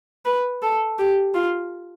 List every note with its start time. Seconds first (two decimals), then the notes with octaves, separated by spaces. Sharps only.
0.25 B4
0.62 A4
0.99 G4
1.35 F4